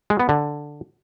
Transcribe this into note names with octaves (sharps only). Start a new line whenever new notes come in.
G#3
B3
D3